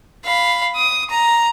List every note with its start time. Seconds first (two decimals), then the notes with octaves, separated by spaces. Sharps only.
0.25 F5 B5
0.76 D#6
1.10 A#5